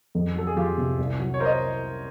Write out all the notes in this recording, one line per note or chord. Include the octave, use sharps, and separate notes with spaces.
F2
F#3 A4
G#4
F2 F4 G4
C3
C2
F#3
C#5
A#4 C5
D#5